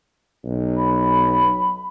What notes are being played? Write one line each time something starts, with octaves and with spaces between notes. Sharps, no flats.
B1
B5